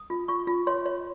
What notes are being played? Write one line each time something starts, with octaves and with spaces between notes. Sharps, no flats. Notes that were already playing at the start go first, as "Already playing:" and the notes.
Already playing: D#6
F4
F4 C#6
F4
C#5 C6
C#5